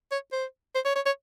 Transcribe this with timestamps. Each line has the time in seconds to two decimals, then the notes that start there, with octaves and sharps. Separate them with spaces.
0.11 C#5
0.32 C5
0.75 C5
0.85 C#5
0.95 C#5
1.06 C#5